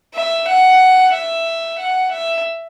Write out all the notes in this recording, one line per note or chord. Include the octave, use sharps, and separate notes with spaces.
E5
F#5
E5
F#5
E5